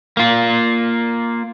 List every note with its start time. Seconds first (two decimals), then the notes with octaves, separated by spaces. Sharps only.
0.17 A#3 F4